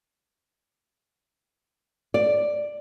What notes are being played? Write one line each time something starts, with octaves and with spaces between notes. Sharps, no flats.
D5